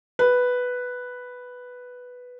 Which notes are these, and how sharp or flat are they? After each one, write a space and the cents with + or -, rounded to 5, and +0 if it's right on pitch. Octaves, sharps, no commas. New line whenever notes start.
B4 +0